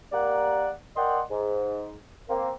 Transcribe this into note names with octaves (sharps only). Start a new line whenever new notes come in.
G3 A#3 G4 A#4 D5 F#5
A#4 D5 D#5 F#5 G5 C6
G#2
A#3 C4